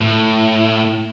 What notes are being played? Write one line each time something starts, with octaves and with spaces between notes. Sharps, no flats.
A2